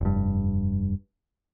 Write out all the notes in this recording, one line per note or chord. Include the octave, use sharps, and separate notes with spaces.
F1 G2